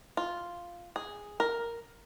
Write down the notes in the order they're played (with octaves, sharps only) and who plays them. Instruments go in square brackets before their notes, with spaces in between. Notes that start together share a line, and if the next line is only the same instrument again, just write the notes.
[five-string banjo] F4
G#4
A#4